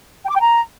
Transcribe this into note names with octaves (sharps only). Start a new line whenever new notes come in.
G5
D6
G5
A#5